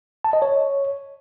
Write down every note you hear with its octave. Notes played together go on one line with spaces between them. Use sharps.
A5
D#5
C#5